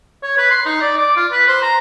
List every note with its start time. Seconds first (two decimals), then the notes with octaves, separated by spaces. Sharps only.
0.23 C#5
0.37 B4
0.51 C6
0.65 D#4
0.81 D5
0.97 D6
1.16 F4
1.32 B4
1.48 C5
1.62 A#5